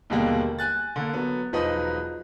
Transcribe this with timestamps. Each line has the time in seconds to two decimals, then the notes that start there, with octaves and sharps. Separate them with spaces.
0.10 D#2 B2 D3 G3 G#3 A#3
0.59 G#5 F#6 A6
0.96 D3 A#3
1.13 F#3 B3
1.53 E1 F3 F#3 D#4 B4 D#5